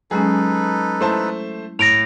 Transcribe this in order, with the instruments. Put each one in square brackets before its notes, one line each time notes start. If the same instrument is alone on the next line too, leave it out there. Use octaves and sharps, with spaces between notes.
[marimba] F#3 G#3 C#4 [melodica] D#4 A4 B4 [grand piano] G#4
[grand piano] A3 C5 A5 [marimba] E4
[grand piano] A2 [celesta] A#6 D7 F7